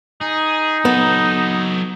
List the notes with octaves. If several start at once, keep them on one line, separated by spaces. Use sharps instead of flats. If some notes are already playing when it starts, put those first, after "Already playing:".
D#4 G#4
F#3 B3 A4